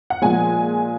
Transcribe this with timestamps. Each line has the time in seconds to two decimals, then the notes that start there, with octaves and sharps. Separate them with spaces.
0.10 F#5
0.22 A#2 F3 G#3 G#5